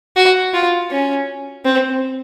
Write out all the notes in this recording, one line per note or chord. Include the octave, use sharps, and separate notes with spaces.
F#4
F4
C#4
C4